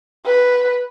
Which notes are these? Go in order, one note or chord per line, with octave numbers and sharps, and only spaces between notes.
B4